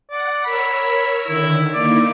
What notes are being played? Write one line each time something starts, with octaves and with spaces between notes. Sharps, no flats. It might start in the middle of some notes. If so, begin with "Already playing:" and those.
D5 F#5
A#4 C#5 B5 E6
D3 D#3 E4
A#3 D#4 E4 D5